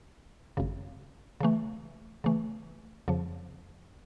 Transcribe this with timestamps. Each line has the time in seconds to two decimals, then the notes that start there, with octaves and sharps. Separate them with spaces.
0.57 G#1 F#2 C#3
1.41 C#3 E3 A3
2.24 C#3 E3 A3
3.08 F2 C#3 F3